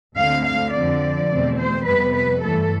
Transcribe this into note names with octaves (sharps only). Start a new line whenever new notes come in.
D2 D3 A3 C4 F5
F5
F2 D3 F3 C4 D5
E2 B2 A3 C4
C5
F2 C3 G3 B3 B4
B4
G2 E3 A3 A4